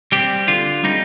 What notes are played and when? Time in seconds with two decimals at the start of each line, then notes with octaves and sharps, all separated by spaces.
0.12 G3 C4 G4
0.48 D3 F4
0.83 G3 C4 D#4